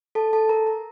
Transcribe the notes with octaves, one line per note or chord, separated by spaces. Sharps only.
A4 A5
A4 A5
A#4 A#5
A#4 A#5